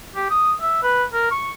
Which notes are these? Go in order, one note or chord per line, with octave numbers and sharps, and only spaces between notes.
G4
D#6
E5
B4
A#4
C#6